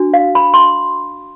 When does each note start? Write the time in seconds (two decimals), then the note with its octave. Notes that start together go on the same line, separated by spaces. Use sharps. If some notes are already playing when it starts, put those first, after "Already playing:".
Already playing: D4 F#4
0.14 F5
0.35 B5
0.54 C6